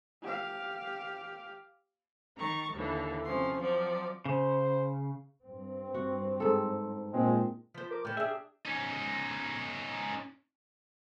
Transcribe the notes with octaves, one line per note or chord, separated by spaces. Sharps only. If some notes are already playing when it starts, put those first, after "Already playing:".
G4 F5
D#3 A#5 C#6 A6
D#2 D3 E3
C3 F3 C#4 C6
F3 F#3 C4 D5
C#3 C5
G2 C4
F#4
G#2 A4
A#2 G#3 C4
F3 C5 B6
A#4 D6
A2 C#4 G5 F6
D4 G4 G#4 E5
C#4 D#4